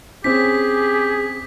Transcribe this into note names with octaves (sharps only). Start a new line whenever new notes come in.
C4 C#4 G4 G#4 B6